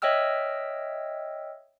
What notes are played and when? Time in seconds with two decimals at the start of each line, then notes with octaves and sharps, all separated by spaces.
0.02 C#5 D#5 E5 G5 E6 F6